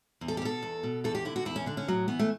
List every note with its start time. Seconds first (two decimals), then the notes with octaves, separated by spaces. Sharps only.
0.21 E2
0.28 A4
0.37 G4
0.42 B2 A4
0.63 E2
0.83 B2
1.04 E2 A4
1.15 G4
1.25 D3 E4
1.36 F#4
1.45 E2 E4
1.56 C#4
1.66 D3 D4
1.77 C#4
1.88 A2 F#3
2.08 E3 B3
2.19 A3